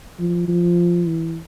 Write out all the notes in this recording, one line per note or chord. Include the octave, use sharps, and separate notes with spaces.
F3
F3
E3